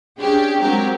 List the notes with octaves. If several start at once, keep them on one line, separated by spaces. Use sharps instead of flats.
C#4 D4 G4 G#4 G5
F#3 G#3 C4 G4 A#4